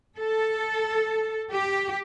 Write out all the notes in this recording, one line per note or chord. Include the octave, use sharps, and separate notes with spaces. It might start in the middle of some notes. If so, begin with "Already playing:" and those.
A4
G4